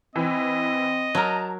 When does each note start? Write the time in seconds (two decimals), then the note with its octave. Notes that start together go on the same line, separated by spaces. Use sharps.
0.16 E3 C4 D#5
1.15 F#3 A#4 A5 A#5